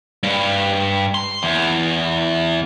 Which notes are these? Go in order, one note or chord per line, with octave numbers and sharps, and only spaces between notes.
G2
C6
E2